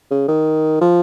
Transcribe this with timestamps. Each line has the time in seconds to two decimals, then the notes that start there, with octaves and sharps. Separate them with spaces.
0.11 C#3
0.28 D#3
0.81 F3